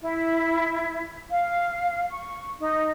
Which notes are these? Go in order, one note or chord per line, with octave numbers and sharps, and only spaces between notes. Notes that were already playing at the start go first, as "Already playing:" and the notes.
E4
F5
C#6
D#4